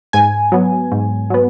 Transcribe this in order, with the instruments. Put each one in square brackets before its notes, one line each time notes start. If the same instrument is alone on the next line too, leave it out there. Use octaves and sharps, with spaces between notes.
[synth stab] G#2 G#5
F#3 B3
G#2
F#3 B3